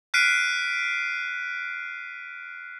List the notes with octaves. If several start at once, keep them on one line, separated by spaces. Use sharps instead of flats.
F6 F#6 B6 C7 D7 D#7